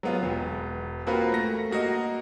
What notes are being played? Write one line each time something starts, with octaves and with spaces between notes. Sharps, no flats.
F#3 G#3 B3 F4
E1
A#3 C4 F4 F#4 A#4 B4
A3 A#6
A#3 F#4 A#4 D#5